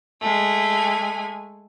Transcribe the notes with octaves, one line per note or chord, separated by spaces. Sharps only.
G#3 A3 G#5